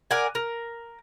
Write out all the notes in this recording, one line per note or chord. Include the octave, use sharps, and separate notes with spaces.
A#4 D5 F#5 G#5
A#4